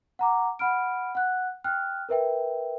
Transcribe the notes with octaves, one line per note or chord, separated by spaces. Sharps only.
F#5 A#5 D6
F#5 B5 F6 D7
F#5 F#6
G5 F6 F#6
A#4 B4 E5 G5